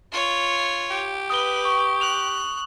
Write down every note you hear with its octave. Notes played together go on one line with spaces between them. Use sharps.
F4 C#5
G4
B4 D#6 G7
C#6
F#6 F7